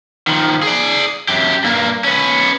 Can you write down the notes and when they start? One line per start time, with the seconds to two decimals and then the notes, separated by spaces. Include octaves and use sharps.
0.27 D#3 F3
0.63 G#4 D5
1.29 F#2 G4
1.64 G2 A#3
2.04 C#4 B4